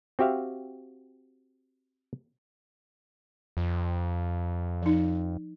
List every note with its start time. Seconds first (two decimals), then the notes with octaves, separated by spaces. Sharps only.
0.19 C4 F#4 G4 E5 F5
3.57 F2
4.82 F3 D#4